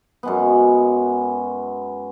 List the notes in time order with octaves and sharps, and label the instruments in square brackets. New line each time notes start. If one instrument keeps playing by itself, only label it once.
[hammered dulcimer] F#2 G#3 B3